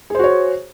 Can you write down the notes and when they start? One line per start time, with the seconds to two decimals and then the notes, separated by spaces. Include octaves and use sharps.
0.10 G#4
0.15 C5
0.19 F#4
0.24 C#5